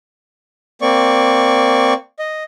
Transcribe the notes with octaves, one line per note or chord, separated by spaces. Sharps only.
A#3 C4 D5 C#6
D#5